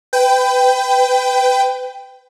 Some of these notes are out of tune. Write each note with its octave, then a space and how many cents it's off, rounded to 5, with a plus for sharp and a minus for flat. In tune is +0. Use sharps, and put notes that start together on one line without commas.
B4 +30 G5 +0